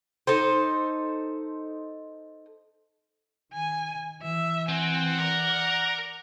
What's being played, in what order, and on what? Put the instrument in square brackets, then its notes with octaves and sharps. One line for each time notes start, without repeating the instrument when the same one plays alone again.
[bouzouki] D#4 A4 C5
[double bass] D#3 [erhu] G#5
[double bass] E3 [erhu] E5
[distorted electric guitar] C4 [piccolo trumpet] F#5 [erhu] G#5
[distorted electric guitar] A#4 [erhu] D5